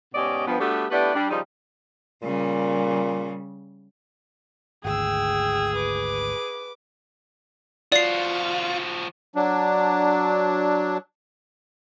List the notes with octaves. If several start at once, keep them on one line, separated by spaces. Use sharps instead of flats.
G#2 B2 C#4 G4 D5 D#5
G2 F3 B3
G3 A3 B3 D4 F#4 G4
A3 B3 D4 E4 G4 B4
G3 D4
C#3 F3 G3 D#4
A#2 C#3 G3
G#1 D2 G#4 G5 E6
B4 D6
F3 F4 F#4 D5 C7
F#3 D4